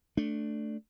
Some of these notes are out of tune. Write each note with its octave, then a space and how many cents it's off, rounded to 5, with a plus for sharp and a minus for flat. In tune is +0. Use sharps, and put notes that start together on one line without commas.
A3 +0 D4 +0